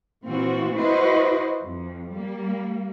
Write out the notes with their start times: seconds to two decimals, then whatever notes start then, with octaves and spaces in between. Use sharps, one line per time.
0.24 A#2 E3 C4 F4 F#4
0.76 E4 F#4 B4 C5 D#5
1.62 F2
2.11 G3 A#3